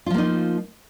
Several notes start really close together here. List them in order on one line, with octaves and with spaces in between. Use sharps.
F4 F3 A#3 D#4